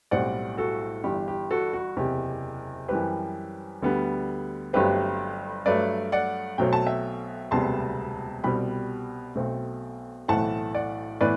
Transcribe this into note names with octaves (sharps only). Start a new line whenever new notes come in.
B1 A2 G3 C4 D5 F#5
F#4 A4
G1 G2 E3 G4
G4
F#4 A4
F#4
F#1 E2 C3 G4
F#2 E3 G3 C4 G4 B4
D2 D3 G3 B3
G1 G2 F#3 A3 C4 G4 B4
G2 F#3 A3 B4 D5
D5 F#5
B1 B2 F#3 A3 C4 G5
A5
E5 G5
E1 D2 C3 G3 B3 A5 C6
C2 B2 G3 C4 G5 B5
B1 B2 A3 C4
B1 A2 E3 A3 C4 F#5 A5
D5 F#5
A2 E3 B3 B4 D5